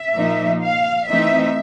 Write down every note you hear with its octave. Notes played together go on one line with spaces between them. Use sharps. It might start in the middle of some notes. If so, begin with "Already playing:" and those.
Already playing: E5
A#2 F3 A#3 D#4
F5
E3 A3 C4 D#4 E5